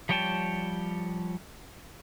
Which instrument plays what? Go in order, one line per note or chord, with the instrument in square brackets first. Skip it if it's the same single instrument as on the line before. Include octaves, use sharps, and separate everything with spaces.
[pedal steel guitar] F3 G3 C#5 G5 A5